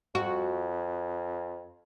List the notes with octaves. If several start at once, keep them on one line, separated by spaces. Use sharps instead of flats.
F2 F#4